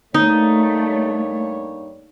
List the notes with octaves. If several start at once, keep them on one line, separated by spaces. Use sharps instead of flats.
G2 A3 A#3 D#4 C#5